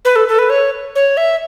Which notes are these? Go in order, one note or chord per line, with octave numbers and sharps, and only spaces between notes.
B4
A4
A4
B4
C#5
C#5
E5